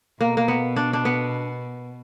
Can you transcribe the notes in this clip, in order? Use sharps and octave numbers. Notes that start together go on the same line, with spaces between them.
B2 A#3
A#3
B3
D4
D4
B3